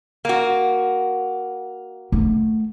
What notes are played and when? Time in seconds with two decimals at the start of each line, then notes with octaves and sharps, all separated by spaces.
0.25 A#3 F#4
2.12 A3